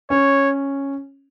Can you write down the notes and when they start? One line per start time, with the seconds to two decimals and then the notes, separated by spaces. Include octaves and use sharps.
0.10 C#4 C#5